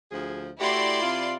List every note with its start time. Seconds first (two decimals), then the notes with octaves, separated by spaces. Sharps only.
0.12 D2 F3 G#4
0.60 A3 E4 F#4 G4 D5 C6
1.02 C3 F4